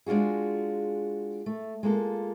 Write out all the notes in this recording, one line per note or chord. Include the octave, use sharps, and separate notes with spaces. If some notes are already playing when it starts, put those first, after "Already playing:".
G#3 D4 F4 F#4 G#4
A3
G#3 A#3 F4 A4